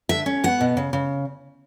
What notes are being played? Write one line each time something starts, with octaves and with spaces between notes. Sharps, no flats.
D3 E5
C#4
B3 F#5
B2
C#3
C#3